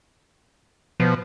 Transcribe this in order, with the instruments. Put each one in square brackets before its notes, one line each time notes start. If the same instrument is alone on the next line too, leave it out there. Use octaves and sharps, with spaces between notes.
[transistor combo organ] B2 [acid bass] F3